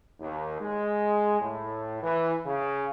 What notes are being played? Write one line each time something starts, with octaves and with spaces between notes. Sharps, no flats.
D#2
G#3
A2
E3
C#3